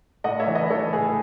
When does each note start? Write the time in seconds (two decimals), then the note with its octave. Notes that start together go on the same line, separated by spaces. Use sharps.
0.24 A2 D#5 F#5
0.40 C#5 E5
0.47 E3
0.55 B4 D#5
0.70 E3 A4 C#5
0.93 A2 G#4 B4